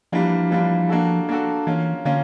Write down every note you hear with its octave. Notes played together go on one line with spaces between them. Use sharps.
E3 F3 G3 A#3 D4 F4
E3 G3 A#3 D4 F4
A#3 D4 F#4 A4
A#3 D4 F#4 A4
E3 A#3 C#4 F4
D3 A#3 C#4 F4